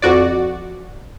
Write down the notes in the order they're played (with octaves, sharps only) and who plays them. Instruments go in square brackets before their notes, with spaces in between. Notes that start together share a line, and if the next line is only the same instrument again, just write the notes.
[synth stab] F2 F#4 D5